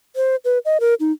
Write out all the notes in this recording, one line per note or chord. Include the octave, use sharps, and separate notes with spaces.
C5
B4
D#5
A#4
D#4